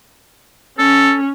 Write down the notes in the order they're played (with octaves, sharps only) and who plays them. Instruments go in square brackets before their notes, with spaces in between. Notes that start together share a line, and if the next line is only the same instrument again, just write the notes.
[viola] C#4 [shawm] A4